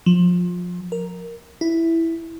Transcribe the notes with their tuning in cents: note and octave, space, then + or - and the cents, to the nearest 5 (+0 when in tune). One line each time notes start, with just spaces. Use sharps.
F3 +25
A#4 +0
E4 +0